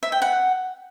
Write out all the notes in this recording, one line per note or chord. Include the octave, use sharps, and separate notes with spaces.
E5
G5
F#5